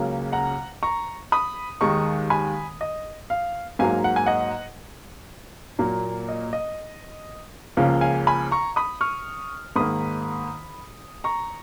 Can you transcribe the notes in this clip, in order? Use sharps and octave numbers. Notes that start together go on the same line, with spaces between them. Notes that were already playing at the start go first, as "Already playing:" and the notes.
Already playing: C#2 C#3 F#3 A#3
F#5 A#5
A#5 C#6
B5 D#6
D#2 D#3 G#3 A#5 C#6
G#5 B5
D#5
F5
G#2 F#3 A#3 F5 G#5
F#5
G#5
D#5 F#5
A#2 F#3 A#3
D#5
D#5
C#2 C#3 F3 A#3 F5
F5 G#5
G#5 B5
A#5 C#6
B5 D#6
C#6 F6
G#2 D#3 A#3 B5 D#6
A#5 C#6